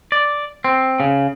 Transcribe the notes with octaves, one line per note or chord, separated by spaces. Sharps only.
D5
C4
C#3